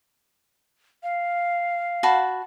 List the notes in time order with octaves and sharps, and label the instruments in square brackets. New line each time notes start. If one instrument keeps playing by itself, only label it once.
[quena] F5
[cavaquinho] F#4 A5 B5